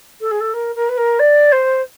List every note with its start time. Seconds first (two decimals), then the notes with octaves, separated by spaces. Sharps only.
0.20 A4
0.31 G#4
0.40 A4
0.53 A#4
0.75 A#4
0.89 B4
0.97 A#4
1.19 D5
1.52 C5